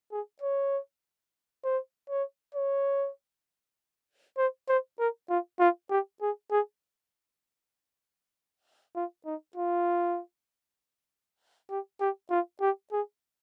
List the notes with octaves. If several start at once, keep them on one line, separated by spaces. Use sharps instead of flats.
G#4
C#5
C5
C#5
C#5
C5
C5
A#4
F4
F4
G4
G#4
G#4
F4
D#4
F4
G4
G4
F4
G4
G#4